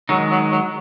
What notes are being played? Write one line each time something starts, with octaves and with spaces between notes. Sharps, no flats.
D#3 F#3 G#3 D#4
F#3
F#3